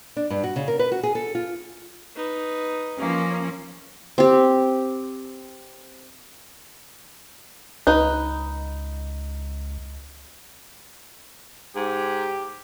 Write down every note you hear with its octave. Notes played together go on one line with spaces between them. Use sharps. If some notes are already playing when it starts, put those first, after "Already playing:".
D4
G2
F#4
C#3
A#4
B4
F#4
G#4
A4
F4
D#4 B4
F3 A#3 C#4
C4 G4
C#2 D#4 B4
G#2 G4